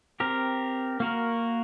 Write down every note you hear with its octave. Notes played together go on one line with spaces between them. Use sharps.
C4 G4 A#4
A#3 F#4 A#4